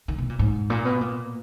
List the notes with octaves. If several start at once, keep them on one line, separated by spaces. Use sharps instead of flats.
D#3
B2
A#2
G#2
A#2
B2
A#2